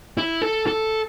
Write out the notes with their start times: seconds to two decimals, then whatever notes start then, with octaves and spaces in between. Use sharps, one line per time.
0.18 E4
0.42 A4
0.67 A4